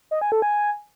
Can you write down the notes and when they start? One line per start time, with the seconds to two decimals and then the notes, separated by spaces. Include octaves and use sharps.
0.11 D#5
0.21 G#5
0.32 A4
0.42 G#5